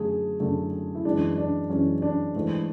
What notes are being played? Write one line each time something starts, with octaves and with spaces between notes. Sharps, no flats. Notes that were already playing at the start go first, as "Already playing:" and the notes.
Already playing: F#2 D3 A3 G#4
F#2 D3 A3
E4
F#2 E3 G#3 D4
D4
F#2 E3 G#3 C#4
D4
G#2 E3 A3